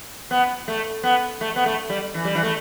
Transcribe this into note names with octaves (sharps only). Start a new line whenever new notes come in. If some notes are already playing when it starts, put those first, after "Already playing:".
B3
A3
B3
A3
B3
A3
G3
E3
G3
E3
A3